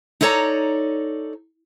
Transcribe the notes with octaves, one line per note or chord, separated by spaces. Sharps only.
D#4 E4 A4 C#5 D5 A#5